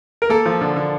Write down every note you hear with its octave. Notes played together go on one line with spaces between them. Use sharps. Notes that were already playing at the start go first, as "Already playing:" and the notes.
A#4
A#3 A4
F3
D3
D3